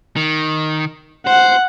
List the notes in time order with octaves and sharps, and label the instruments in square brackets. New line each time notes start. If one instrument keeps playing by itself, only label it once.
[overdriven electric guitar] D#3
[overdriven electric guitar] C5 [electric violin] F#5